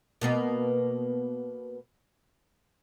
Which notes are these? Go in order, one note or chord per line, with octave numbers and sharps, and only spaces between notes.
B2 A#3 B3